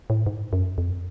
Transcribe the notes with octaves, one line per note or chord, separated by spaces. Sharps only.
A2
G#2
F#2
F2